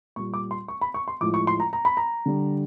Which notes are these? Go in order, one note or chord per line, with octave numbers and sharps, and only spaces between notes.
A#2 G3 C#6
D6
C6
C#6
B5
C#6
C6
A2 F3 G#3 D6
C#6
C6
A#5
A#5
B5
A#5
D3 G3